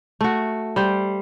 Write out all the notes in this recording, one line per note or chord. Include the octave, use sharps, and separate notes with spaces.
A3 F#4
G3 C5